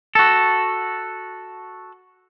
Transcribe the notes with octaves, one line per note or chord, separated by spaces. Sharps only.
F#4 A4